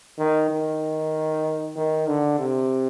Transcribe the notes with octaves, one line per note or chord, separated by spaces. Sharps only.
D#3
D#3
D#3
D3
C3